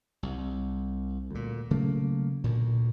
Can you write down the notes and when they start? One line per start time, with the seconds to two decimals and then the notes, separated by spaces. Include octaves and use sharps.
0.23 C2
1.31 D2 A#2
1.71 C#3 F#3 A3 A#3
2.44 D2 A#2